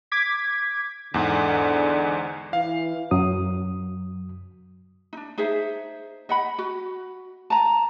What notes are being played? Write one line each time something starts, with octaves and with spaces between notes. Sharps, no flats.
D6 G#6 B6
E2 G#2 D3
E3 F5
F#2 F#3 D#6
D4 D#4
D#4 G#4 C5 E5
D#5 F#5 B5
F#4
A5 A#5